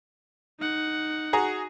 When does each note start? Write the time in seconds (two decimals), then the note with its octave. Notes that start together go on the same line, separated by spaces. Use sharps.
0.60 D#4 F#5
1.33 F#4 G#4 A#5